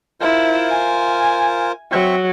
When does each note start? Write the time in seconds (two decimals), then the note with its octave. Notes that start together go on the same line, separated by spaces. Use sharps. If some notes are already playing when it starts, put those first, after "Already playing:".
0.21 E4 F4 A#4 C5
0.70 G#5
1.92 F#3 C4 E5 C#6